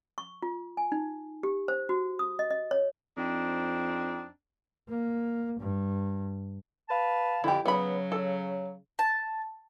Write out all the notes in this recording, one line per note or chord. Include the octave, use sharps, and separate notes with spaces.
C#6
F4
G#5
D#4
G4
C5
F#4
D#6
D#5
D#5
C#5
F2 C4 D4 D#4
A#3
G2
B4 F5 A5
F2 D3 E4 G4
C#3 F#3 B3 B5
A4
A5